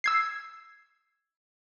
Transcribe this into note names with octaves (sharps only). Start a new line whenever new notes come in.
E6 G#6 C7